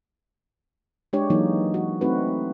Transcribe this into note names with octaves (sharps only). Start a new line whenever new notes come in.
G#3 D4 G4 C#5
E3 F#3 A#3 D#4
F#4
A3 C4 D#4 F#4 B4